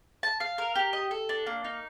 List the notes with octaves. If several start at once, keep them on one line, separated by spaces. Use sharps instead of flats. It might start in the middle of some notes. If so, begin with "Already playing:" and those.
A5
F5
A#4
G4
D#5
A4
D4
A#3
D#4